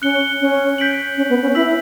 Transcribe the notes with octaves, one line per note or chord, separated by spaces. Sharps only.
C#4 F#6 C#7 G7
C#4
G6 B6 D7 F#7
C#4
B3
C#4
E4 E6 B6 F#7